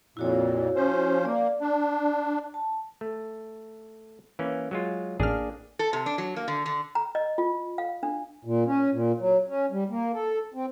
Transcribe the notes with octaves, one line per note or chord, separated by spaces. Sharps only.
F2 A#2 E4 F#4 C#5
F3 C#4 C5
A#3 D5
D4
A5
A3
E3 A#3 C#4
F#3 G#3 F4
A1 A#3 D4 G#4 F6
A4
C3
D4
F#3
A#3
D3
D3
A#5
D#5
F4
F5
D4
A#2
C#4
A#2
F#3
C#4
G3
A#3
A4
C4